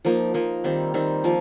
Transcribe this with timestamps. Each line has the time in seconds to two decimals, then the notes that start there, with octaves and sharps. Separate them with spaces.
0.05 F3 A#3 D#4
0.34 F3 A#3 D#4
0.64 D#3 G3 C4
0.94 D#3 G3 C4
1.24 F3 A#3